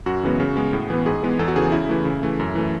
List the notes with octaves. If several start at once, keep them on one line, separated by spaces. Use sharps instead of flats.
F#2 F#4
C#3 E3 G#3 B3
C#3
G#3 B3
A2
E3 B3
G#2 G#4
E3 G#3 B3
E2 A4
F#4
C#3 E3 G#4
C#3 E4
E3 A3
C#3
E3 A3
F#2
E3 A3